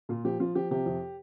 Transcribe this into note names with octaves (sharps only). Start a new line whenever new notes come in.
A#2 F4
F3 G4
F3 F4
F3 G4
C3 G4
F2